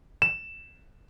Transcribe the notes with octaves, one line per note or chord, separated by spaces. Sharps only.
E7